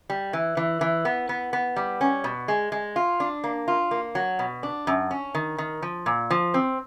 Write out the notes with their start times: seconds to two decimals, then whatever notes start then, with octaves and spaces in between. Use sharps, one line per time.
0.10 G3
0.33 E3
0.57 E3
0.81 E3
1.05 B3
1.29 B3
1.53 B3
1.76 G3
2.01 C#4
2.24 B2
2.48 G#3
2.72 G#3
2.96 F4
3.20 D4
3.44 A#3
3.68 F4
3.91 A#3
4.15 F#3
4.39 B2
4.63 D4
4.87 F#2
5.11 C#4
5.35 D#3
5.58 D#3
5.83 F3
6.06 A#2
6.31 F3
6.54 C4